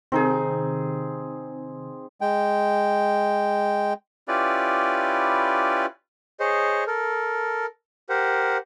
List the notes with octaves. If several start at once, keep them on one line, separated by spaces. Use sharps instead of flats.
C3 D#3 C4 D#4 G#4
G#3 G5
C#4 E4 F4 G4 B4 D5
G#4 C5 C#5 D#5
A4 A#4
G4 A#4 C5 F#5